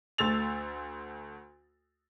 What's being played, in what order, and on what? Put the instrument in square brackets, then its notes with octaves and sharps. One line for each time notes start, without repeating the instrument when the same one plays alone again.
[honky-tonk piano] D2 A3 C6 E6 A6 F7